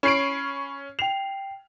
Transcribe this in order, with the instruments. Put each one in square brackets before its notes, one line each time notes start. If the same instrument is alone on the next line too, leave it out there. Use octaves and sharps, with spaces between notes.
[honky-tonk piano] C#4 C7 D7 [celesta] B5 C#6 F#7
[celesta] G5 C7 [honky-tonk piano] F7